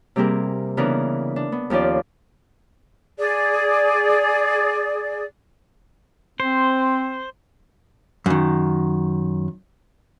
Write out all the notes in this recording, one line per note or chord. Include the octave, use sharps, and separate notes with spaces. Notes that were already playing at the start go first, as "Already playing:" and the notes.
C3 G3 A#3 C4 G#4 A#4
C#3 E3 B3 D4 A#4
D4
B3
D#2 F3 C#4 F4 D5
G#4 D5
C4 C5
F#2 D#3